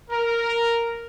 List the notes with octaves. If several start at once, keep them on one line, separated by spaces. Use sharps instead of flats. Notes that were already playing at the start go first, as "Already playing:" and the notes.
A#4